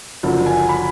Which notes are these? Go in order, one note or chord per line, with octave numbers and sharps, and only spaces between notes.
F#1 F#2 D3 F3
G#5
B5